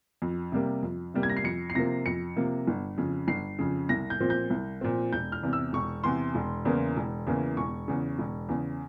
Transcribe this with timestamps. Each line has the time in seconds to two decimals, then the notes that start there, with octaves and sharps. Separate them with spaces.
0.22 F2
0.52 C3 G3 A#3
0.83 F2
1.14 C3 G3 A#3
1.23 G#6
1.29 A#6
1.37 C7
1.44 F2 C#7
1.70 C7
1.75 C3 F3 A#3 A#6
2.06 F2 C#7
2.36 C3 F3 A#3
2.67 G1
2.98 F2 C#3
3.28 G1 C7
3.59 F2 C#3
3.89 C2 A#6
4.10 G6
4.20 A#2 F3 C4
4.30 G6
4.50 C2
4.81 A#2 F3 C4
5.13 E1 G6
5.32 F6
5.43 E2 C3
5.53 E6
5.73 E1 C#6
6.04 E2 C3 C6
6.35 E1
6.65 E2 C#3 E3 A#3
6.97 E1
7.27 E2 C#3 E3 A#3
7.57 E1 C#6
7.88 E2 C#3
8.18 E1
8.49 E2 C#3